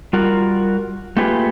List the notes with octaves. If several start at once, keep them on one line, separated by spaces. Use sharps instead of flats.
G3 F4 F#4 A#4
A3 A#3 F4 G4 G#4 B4